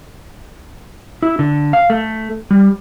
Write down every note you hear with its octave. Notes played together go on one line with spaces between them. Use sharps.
E4
D3
F5
A3
G3